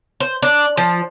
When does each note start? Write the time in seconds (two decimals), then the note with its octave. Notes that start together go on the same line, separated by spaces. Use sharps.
0.20 C5
0.42 D4
0.77 F3